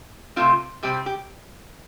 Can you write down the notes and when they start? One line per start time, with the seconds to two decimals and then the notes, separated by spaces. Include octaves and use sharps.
0.36 C3 A3 C4 F4
0.83 C3 G3 C4 G4
1.06 G4